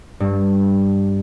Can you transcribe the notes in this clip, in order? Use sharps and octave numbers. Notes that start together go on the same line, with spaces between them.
G2